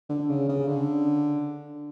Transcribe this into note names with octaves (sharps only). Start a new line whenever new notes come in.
D3
C#3
C#3
D3